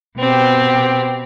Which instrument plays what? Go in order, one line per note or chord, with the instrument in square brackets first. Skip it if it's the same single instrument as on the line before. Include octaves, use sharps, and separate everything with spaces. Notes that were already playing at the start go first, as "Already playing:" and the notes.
[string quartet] B2 C4 G4